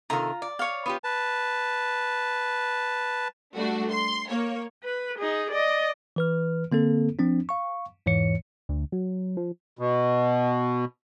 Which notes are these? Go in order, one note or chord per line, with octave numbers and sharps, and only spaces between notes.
C3 D#3 F4 A4 A#5
D5
C#5 F5
B3 F4 G4
B4 A5
G3 A3 D4 F#4
C6
A#3 C#5
B4
D#4 G#4
D5 D#5
E3 B4 F6
D3 A#3 C4 A4
F3 C4 D4
F5 C#6
E2 G#2 E3 C#5 C#7
D2
F#3
F3
B2